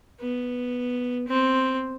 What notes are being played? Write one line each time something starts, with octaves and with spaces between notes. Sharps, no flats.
B3
C4